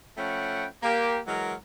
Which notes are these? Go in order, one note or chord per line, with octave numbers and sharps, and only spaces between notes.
F3 A3 C#4 F#5 G5 B5
A#3 G4
E3 F#3 G#3 A#4